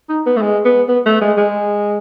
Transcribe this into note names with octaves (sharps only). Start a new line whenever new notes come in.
D#4
B3
A3
G#3
B3
B3
A3
G#3
G#3